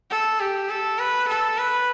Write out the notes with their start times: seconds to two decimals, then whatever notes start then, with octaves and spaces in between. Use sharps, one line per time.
0.11 A4
0.40 G4
0.69 A4
0.99 B4
1.28 A4
1.58 B4